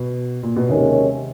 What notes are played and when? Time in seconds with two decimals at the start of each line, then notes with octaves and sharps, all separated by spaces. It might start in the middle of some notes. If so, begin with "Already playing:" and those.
Already playing: B2
0.43 A#2
0.56 B2
0.69 D#2 C3 D#3 G#3 C#4